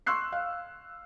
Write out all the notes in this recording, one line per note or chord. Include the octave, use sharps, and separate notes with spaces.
C6 C#6 E6 F#6 C7
F5